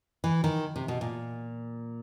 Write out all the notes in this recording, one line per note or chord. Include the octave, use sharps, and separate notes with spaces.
E3
D#3
C3
B2
A#2